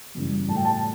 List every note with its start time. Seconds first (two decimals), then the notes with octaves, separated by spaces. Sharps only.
0.15 F#2 C#3 E3 G3
0.48 A2 F#3 A3 A5
0.56 G5
0.65 A5